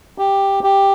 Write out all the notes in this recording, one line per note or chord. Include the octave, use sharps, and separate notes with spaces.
G4
G4